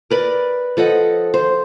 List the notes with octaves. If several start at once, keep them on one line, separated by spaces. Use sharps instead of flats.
A#4 B4 D5
F3 A4 D#5 F#5
C5